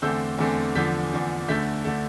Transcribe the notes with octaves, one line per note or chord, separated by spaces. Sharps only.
E2 D3 A3 C4 E6 G6
E2 D3 A3 C4
E2 D3 F3 G6 B6
E2 D3 F3
D2 D3 A3 G6 B6
D3 A3